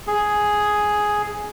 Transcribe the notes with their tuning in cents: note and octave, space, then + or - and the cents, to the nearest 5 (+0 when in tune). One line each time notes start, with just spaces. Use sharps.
G#4 +5